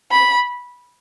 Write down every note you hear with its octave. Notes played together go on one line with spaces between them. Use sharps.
B5